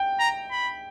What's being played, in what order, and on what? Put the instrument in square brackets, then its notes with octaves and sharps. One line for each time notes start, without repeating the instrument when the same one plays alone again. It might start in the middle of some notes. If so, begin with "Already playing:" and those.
Already playing: [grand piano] G5
[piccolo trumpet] A#5
B5